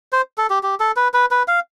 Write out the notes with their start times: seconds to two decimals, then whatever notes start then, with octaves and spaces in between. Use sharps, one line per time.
0.13 C5
0.38 A4
0.50 G4
0.63 G4
0.80 A4
0.96 B4
1.14 B4
1.31 B4
1.48 F5